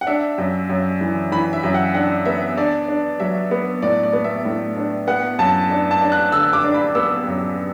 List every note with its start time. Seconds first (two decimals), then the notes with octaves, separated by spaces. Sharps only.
0.01 F#5
0.07 D4 E5
0.38 F#2
0.69 F#2
1.01 E3
1.32 E3 B5
1.53 E5
1.63 F#2
1.74 F#5
1.94 D4 F#5
2.25 B3 E5
2.57 D4 D5
2.88 D4
3.20 F#3 E5
3.51 B3
3.82 A2 D5
4.03 D5
4.13 B3
4.24 E5
4.45 A2
4.77 D4
5.07 B3 F#5
5.39 F#2 A5
5.70 D4
5.91 A5
6.01 D4
6.12 F#6
6.32 D3 E6
6.53 D6
6.64 D4
6.74 B5
6.95 B3 E6
7.27 F#2